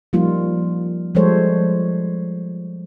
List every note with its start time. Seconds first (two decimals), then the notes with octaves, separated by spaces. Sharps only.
0.13 F3 G3 A#3 D#4 F4
1.15 F3 G3 G#3 A4 C5 C#5